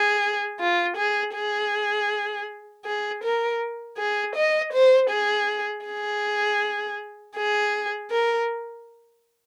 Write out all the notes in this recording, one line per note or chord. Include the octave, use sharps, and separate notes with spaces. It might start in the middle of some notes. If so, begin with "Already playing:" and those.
Already playing: G#4
F4
G#4
G#4
G#4
A#4
G#4
D#5
C5
G#4
G#4
G#4
A#4